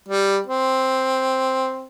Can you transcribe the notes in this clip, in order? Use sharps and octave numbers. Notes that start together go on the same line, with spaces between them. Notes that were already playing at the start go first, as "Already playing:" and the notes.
G3
C4